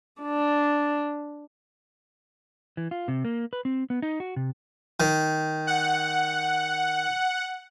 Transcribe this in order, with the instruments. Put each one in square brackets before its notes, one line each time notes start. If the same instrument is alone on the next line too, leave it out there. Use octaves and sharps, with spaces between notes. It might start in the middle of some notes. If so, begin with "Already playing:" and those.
[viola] D4
[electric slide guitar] E3
F4
C3
A#3
B4
C4
B3
D#4
F#4
C3
[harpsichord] D#3
[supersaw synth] F#5